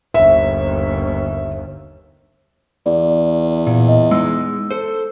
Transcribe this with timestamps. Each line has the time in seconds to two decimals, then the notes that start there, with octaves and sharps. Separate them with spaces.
0.14 G1 D#2 E5
2.86 E2 D5
3.67 A#2
3.88 D#5
4.11 G#3 B3 D#4 E6
4.71 A4 C5